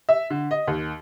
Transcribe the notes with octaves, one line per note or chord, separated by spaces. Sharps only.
E5
D3
D#5
D#2